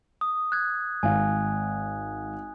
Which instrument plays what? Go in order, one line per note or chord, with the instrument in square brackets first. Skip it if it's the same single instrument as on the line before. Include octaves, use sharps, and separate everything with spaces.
[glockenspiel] D#6
F#6 G#6
[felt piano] G#1 F5 [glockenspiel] G#5